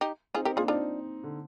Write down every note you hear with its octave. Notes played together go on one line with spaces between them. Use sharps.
D#4 G4
C4 D#4 F4 G#4
C4 D#4 G4 A#4
A#3 D4 F4 G#4
C4 D4 D#4 F4
D3